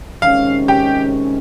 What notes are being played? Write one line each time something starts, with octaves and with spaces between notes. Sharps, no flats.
C3 D#3 G#3 C#4 F5
G4 G5